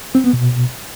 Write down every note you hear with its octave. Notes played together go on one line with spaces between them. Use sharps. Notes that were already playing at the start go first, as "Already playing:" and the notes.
C4
B3
B2